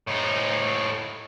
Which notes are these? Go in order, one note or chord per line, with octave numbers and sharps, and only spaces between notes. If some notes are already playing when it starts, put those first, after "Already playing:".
A2 D#4